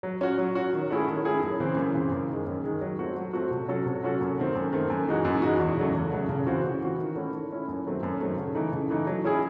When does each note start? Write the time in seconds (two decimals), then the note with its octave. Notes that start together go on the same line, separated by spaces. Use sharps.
0.03 F#3
0.21 C#4 F#4
0.38 F#3
0.55 C#4 F#4
0.73 D#3
0.90 A3 C#4 E4 G#4
1.07 D#3
1.25 A3 C#4 E4 G#4
1.42 F#2
1.60 C#3 E3 C4
1.77 F#2
1.94 C#3 E3 C4
2.12 F#2
2.29 D#3 G#3
2.47 F#2
2.64 D#3 G#3
2.81 F#3
2.99 A3 C4 F#4
3.16 F#3
3.33 A3 C4 F#4
3.51 C3
3.68 F#3 C#4 F#4 A4
3.86 C3
4.03 F#3 C#4 F#4 A4
4.21 F#2
4.38 D#3 A3 C4
4.55 F#2
4.72 D#3 A3 C4
4.90 F#2
5.07 E3 G#3 D#4 F#4
5.25 F#2
5.42 E3 G#3 D#4 F#4
5.59 E2
5.77 C#3 F#3 A3
5.94 E2
6.12 C#3 F#3 A3
6.29 C#3
6.47 E3 C4 F#4
6.64 C#3
6.81 E3 C4 F#4
6.98 D#3
7.16 A3 C#4 E4
7.33 D#3
7.50 A3 C#4 E4
7.68 F#2
7.85 D#3 F#3 A3 C4
8.03 F#2
8.20 D#3 F#3 A3 C4
8.37 C#3
8.55 E3 A3 D#4
8.72 C#3
8.90 E3 A3 D#4
9.07 F#3
9.24 C#4 E4 G#4